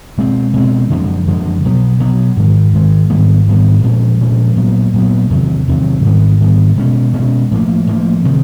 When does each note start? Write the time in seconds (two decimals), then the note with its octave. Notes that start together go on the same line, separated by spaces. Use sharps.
0.18 B2 G#3 C4
0.54 B2 G#3 C4
0.90 F#2 D3 F3 G#3
1.27 F#2 D3 F3 G#3
1.64 B2 F#3 B3
2.00 B2 F#3 B3
2.37 G#2 D#3 G#3
2.73 G#2 D#3 G#3
3.10 G#2 D#3 G3 B3
3.48 G#2 D#3 G3 B3
3.83 A#2 F3 G#3 C#4
4.21 A#2 F3 G#3 C#4
4.57 A#2 F#3 B3
4.94 A#2 F#3 B3
5.30 E2 C3 D#3 F#3
5.68 E2 C3 D#3 F#3
6.04 G#2 D#3 G3 B3
6.40 G#2 D#3 G3 B3
6.77 B2 G#3 C#4
7.14 B2 G#3 C#4
7.51 A2 F3 A#3
7.87 A2 F3 A#3
8.24 C3 D#3 G#3